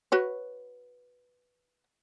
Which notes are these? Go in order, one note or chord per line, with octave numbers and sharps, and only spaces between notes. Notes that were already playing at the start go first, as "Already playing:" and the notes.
F#4 B4 C#5